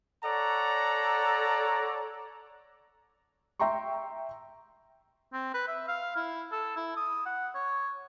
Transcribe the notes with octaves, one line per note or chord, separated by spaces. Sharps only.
A4 C#5 D5 F#5 A#5
E5 G5 A#5 C6 C#6
C4
B4
E5
F5
E4
A4
E4
D#6
F#5
C#5